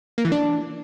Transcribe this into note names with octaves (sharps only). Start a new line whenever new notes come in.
A#3
E3
D4